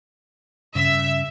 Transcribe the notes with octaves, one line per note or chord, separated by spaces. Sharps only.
G2 C#3 E5